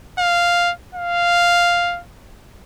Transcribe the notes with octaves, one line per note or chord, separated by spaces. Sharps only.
F5
F5